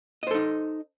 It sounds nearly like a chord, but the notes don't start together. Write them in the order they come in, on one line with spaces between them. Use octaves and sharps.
D#5 C5 A4 D#4